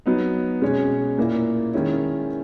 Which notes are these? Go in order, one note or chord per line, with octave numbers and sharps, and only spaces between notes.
F#3 B3 D#4
B2 G#3 C#4
A#2 A#3 E4
D#3 G#3 C#4 E4